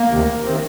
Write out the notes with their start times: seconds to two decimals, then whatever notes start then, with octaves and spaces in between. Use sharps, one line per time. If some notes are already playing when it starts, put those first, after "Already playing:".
Already playing: A#3
0.11 D2 C3 D#3
0.44 C3 D#3 C4